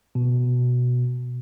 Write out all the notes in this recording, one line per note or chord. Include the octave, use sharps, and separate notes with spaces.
B2